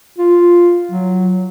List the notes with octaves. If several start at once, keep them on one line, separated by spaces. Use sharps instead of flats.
F4
F#3